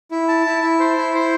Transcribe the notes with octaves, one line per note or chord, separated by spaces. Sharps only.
E4
A5
E4
E4
C5
E4
C5